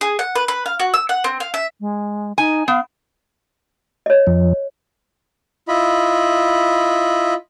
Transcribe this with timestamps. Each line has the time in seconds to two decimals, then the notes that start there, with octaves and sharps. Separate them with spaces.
0.01 G#4
0.19 F#5
0.35 B4
0.48 B4
0.66 F5
0.80 F#4
0.94 E6
1.09 F#5
1.24 C4
1.40 F5
1.54 E5
1.81 G#3
2.38 D#4 G#5
2.68 B3 F5
4.06 C#5 D#5
4.27 F2 F3
5.68 E4 F4 D#5 B5